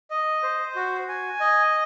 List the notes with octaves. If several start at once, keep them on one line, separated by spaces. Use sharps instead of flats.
D#5
C5
F#4
G#5
D#5